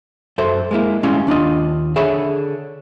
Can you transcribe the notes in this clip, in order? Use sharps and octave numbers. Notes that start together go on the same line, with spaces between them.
F#2 A4 C5 E5
G#3 A#3 E4
G3 G#3 C#4 E4 F5
D#2 D4 F4 D#5
D3 G#4 C#5 E5 B5